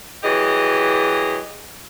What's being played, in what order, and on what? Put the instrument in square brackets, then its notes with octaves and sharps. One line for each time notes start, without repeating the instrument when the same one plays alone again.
[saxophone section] E3 F#3 G4 G#4 D#5